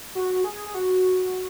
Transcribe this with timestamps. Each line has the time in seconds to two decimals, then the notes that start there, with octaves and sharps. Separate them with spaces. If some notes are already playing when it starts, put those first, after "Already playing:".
0.15 F#4
0.44 G#4
0.66 G#4
0.74 F#4